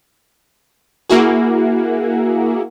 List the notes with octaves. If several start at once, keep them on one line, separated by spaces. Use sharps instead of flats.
A#3 E4 F#4 G#4